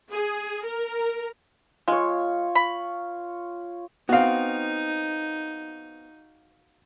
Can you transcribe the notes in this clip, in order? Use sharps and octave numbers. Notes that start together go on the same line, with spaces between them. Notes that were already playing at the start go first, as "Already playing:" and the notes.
G#4
A#4
G#3 F4 C#5
B5
B3 C4 D#4 F#4 F5